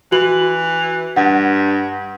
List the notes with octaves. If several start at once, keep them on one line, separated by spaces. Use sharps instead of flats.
E3 F#4 F#7
G2 F#5